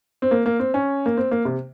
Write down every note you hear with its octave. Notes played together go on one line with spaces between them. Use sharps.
C4
A#3
A#3
C4
C#4
A#3
C4
A#3
C3